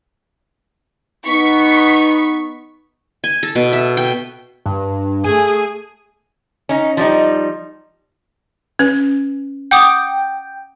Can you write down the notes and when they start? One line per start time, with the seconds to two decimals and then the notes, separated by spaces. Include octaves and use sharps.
1.26 B3 D#4 C#6 B6
3.24 G#5
3.43 A4
3.55 B2
3.73 E5
3.97 G5
4.66 G2
5.25 A3 G#4 G#5
6.69 C#4 D#4
6.97 F3 G3 D#4
8.79 C#4 B4
9.71 F#5 G5 D6 D#6